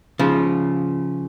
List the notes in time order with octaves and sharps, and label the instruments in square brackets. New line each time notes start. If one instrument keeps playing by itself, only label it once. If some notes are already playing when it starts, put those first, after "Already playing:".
[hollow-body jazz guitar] C#3 F3